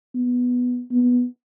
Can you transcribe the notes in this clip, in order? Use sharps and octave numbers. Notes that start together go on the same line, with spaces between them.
B3
B3